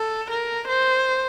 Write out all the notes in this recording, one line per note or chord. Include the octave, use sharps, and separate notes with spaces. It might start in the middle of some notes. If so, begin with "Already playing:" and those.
Already playing: A4
A#4
C5